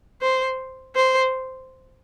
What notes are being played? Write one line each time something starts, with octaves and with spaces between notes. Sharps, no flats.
C5
C5